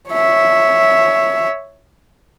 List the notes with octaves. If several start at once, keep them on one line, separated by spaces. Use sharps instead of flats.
C#5 E5